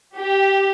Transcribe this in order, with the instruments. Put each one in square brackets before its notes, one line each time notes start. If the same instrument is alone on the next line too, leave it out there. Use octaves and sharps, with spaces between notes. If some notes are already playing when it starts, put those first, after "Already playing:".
[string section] G4